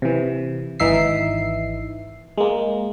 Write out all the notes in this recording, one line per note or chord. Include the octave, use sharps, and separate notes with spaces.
C3 E3
G#1 E3 D#4 E5 C7
G#3 A#3